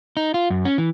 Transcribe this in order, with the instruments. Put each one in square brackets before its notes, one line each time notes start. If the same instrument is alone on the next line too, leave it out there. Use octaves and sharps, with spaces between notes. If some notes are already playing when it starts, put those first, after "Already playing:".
[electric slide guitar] D#4
F4
F#2
C#4
E3